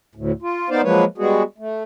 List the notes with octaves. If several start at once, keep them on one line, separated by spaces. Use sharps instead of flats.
D2 A2
F4
B3 D#4 C5 D5 F5
F3 F#3 G#3 A#3 B4 C#5
G3 G#3 B3 F#4 G#4
A3